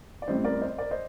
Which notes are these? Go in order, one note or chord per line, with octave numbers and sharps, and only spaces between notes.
D5
A1 A2 G3 C4 C5 D#5
A#4 D5
C5 D#5
A#4 D5
C5 D#5